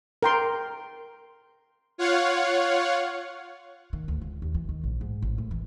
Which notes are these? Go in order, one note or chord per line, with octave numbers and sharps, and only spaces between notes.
A#4 G5 C6
F4 C#5 F5 F#5
D#3
D2
C#2
D#2
E3
D#3
A#1
G#2
A1
A2
E3